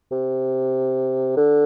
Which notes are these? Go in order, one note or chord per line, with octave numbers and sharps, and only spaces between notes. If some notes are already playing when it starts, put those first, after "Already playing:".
C3
D3